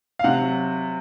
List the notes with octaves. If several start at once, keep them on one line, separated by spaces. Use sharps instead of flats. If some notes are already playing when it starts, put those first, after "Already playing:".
F5
C3 F#5
F#3